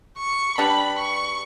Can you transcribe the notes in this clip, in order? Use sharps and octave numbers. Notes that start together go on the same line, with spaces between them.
C#6
G3 D4 G4 B4 B5
C#6